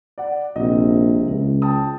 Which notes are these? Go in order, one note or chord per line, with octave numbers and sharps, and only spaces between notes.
D5 F#5
A#1 C3 D#5
C#2
G5 A5 D#6